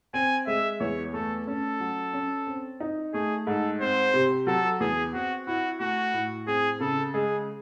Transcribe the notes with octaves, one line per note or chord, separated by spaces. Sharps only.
C4 G#5
G#3 E5
E2 C#5
A3 A4
C#4 A4
F#3
C#4
C4
D#4
A3 G#4
G#2 A4
C4 C5
C3
F#3 A4
E2 G#4
C4 F#4
E4 F#4
A3 F#4
A2
C4 G#4
C#3 A4
G#3 G#4